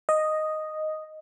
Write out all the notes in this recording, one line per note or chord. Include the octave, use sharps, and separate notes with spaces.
D#5